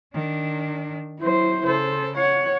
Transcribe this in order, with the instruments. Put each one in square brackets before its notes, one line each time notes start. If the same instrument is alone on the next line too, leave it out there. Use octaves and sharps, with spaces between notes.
[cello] D#3 D4
[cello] F#3 [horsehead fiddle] E4 C5
[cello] C#3 A4 [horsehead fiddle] C5
[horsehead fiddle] C#5 [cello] F#5